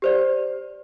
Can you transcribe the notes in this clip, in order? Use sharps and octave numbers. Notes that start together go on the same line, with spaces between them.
G4 C5 D5